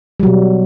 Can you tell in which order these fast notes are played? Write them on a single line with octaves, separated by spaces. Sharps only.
G3 F#3 B2